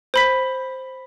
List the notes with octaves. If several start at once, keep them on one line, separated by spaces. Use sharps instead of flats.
C5 B5 B6